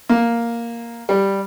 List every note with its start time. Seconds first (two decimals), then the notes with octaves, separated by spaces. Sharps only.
0.09 A#3
1.09 G3